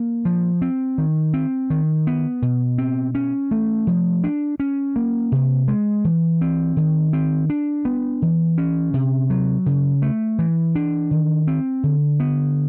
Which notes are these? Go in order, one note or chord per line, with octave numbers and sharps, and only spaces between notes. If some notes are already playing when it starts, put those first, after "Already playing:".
Already playing: A#3
F3
C4
D#3
C4
D#3
B3
B2
C4
C#4
A3
F3
D4
C#4
A#3
C3
G#3
E3
C4
D#3
C4
D4
B3
E3
C#4
C3
F#3
C#3
A3
E3
D4
D#3
C4
D3
B3